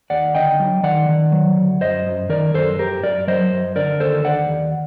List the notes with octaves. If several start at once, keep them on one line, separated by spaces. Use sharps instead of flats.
D#2 D5 F#5
D3 D#5 G5
F#3
D#3 D5 F#5
D#3
F#3
D2
F#2 C5 D#5
F#2
D#3 A#4 D5
F#2 A4 C5
F#2 G4 A#4
F#2 A#4 D5
F#3 C5 D#5
F#2
D3 A#4 D5
D#2 A4 C5
D#2 D5 F#5
D#2